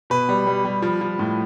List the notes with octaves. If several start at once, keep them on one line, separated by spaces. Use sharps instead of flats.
B2 B4
G3
G3
G3
F3
F3
A2